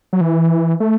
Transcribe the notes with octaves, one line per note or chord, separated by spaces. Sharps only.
F#3
E3
A3